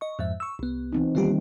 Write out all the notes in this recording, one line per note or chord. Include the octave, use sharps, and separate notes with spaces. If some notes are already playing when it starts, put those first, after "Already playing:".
D#5 C#6
F2 G#2 E5
C#6 E6
C2 B3
E3 C4 D#4
D#3 G3 A#3 B3 F4 G4